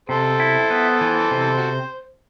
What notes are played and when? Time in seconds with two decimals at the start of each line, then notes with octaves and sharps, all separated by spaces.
0.09 C3 A4 C5
0.40 E4
0.70 B3
1.01 E3
1.31 C3
1.56 F#4